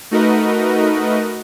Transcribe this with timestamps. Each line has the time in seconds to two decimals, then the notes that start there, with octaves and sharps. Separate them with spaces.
0.11 A3 D#4 F#4 A#4 B4 D#5